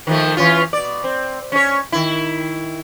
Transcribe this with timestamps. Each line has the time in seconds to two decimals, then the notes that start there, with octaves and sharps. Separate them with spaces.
0.07 D#3 F3 A3
0.37 E3 C#4 F4
0.73 B2 D5
1.04 C4
1.52 C#4 C#5
1.92 D#3 E4